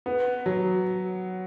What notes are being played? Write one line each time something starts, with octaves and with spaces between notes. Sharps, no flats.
B3
F#3